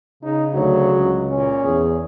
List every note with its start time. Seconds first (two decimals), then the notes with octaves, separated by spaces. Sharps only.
0.23 C#3 D#4
0.54 D2 F#3
0.95 C#2
1.31 A#2 C#4
1.64 E2 G#4